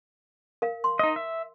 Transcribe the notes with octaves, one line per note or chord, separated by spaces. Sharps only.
A#4 F5
C6
D#4 D#5
E5